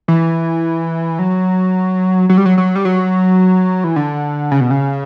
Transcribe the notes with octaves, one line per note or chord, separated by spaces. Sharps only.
E3
F#3
F#3
G3
F#3
F#3
G3
F#3
E3
D3
C#3
B2
C#3